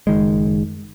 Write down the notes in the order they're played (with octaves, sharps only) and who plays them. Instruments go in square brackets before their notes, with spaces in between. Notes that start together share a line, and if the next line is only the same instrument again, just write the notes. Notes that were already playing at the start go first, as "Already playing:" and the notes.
[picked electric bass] F#1 D#3 G#3